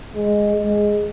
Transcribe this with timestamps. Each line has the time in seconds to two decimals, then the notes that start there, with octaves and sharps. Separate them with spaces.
0.16 G#3
0.56 G#3